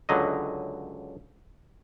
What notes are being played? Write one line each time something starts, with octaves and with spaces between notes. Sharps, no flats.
C#2 D3 F#3 D#5